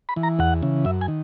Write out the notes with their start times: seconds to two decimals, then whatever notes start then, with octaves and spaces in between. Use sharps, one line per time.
0.09 B5
0.16 E3
0.23 A#5
0.39 E2 F#5
0.62 C#3 E3
0.85 F#2 E5
1.01 G#5
1.08 D#3